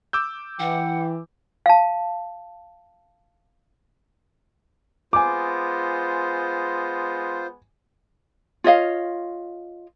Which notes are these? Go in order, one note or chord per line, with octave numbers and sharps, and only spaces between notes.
D6 E6 G6
E3 F#5 G5
F5 A5
G#3 B3 F4 C5 G#5 D6
F4 C#5 D#5 F5